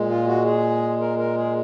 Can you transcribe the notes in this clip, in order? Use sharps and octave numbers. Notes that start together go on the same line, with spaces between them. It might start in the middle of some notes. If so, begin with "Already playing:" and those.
Already playing: A#2 G#3
F4
F#4
G#4
A#4
A#4
G#4